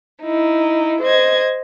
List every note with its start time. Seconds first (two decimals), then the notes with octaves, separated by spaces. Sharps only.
0.21 D#4 E4
1.01 C5 D#5 G#6